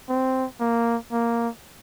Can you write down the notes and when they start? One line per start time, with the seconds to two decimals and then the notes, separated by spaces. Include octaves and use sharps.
0.09 C4
0.60 A#3
1.12 A#3